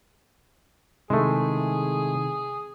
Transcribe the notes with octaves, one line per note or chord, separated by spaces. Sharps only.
C3 D#3 G#3 A3 E4 G#4